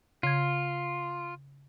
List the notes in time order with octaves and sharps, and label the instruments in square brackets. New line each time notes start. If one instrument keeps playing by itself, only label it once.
[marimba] C#3 G#6 [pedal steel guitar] F4